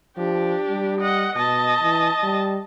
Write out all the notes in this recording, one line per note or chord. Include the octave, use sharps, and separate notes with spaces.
F3 D4 G4
G3
D#5 F#5
B2 D#5 A5
E3
G3